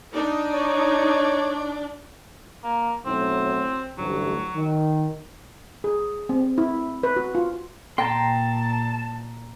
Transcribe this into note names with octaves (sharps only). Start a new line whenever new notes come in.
D4 D#4 D5
C#5
A#3
B1 A2 F#3 C4
A1 D2 G2 F#3
D#3
G#4
C4
E4
B4
F#4
F4
A#2 G5 A5 A#5 C6